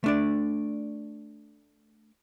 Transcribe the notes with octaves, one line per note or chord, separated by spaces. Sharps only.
A3 D4 D5